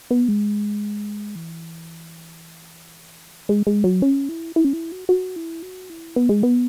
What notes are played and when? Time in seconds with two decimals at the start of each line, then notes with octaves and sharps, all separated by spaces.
0.11 B3
0.28 G#3
1.35 E3
3.49 G#3
3.67 G#3
3.84 F#3
4.02 C#4
4.29 E4
4.56 E4
4.64 C#4
4.73 E4
4.92 F#4
5.09 F#4
5.36 E4
5.62 F#4
5.90 E4
6.16 B3
6.29 G#3
6.43 B3